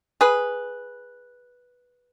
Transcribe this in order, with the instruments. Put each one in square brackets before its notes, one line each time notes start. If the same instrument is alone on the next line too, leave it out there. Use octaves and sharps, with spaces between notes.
[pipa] G#4 B4